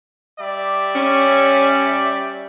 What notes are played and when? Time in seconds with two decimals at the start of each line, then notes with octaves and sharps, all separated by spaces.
0.39 G3 D5 E5
0.95 C#4